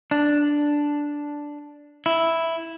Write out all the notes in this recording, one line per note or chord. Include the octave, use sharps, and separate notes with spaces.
D4
E4